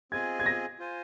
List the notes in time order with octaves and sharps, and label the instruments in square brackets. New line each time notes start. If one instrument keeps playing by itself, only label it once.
[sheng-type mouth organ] C4 F4 G#4 D#5 G#5 [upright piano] G#6
[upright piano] G#6
A#6
[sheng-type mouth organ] F4 C5 G#5